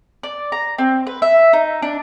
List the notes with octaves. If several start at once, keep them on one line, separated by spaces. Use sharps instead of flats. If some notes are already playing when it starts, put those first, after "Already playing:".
D5
A#5
C4
B4
E5
D#4
D4